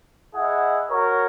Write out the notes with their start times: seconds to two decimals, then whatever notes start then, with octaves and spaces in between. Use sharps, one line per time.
0.35 E4 G#4 D#5 F#5
0.90 F#4 A#4 C#5